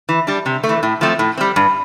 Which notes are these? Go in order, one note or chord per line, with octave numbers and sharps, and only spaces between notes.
E3
G3 D4
C3
A3
E3
A2
F3 A3 C4
A2
G3 C4
G2